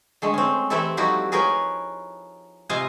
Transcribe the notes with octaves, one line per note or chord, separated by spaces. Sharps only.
D3 G#3 A3
C4 C#4
E3 A3 C4 E4 G4 A4
F3 G3 D#4 E4 F#4 G4
G#4 A#4 B4 C#5 G5
C3 F4 D#5 F5 G#5 A#5